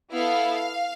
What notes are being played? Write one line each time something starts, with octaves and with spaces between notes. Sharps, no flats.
B3 E4 A4 F5